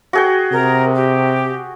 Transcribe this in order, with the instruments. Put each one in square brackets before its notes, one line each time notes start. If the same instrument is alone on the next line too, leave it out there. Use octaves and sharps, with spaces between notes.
[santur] F#4 G#4 G5
[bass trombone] C3 [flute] A#4
[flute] G4